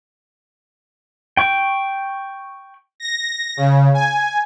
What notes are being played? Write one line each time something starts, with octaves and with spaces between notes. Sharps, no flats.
G5 C#6
A#6
C#3
G#5